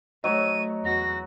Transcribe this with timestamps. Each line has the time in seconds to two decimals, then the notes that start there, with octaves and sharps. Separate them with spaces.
0.24 F#3 A3 C#5 D#5 D#7
0.85 E2 F#4 A#6